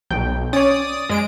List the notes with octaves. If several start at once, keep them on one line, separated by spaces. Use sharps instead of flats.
B1 G5
C#4 C#5 D5 D#6
F#2 G#3 D7